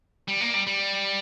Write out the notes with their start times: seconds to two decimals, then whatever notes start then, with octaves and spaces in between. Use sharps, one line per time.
0.28 G3
0.41 A#3
0.54 G3
0.67 G3